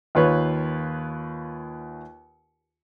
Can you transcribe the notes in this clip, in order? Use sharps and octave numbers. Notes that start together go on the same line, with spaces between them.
D#2 F4 B4 C#5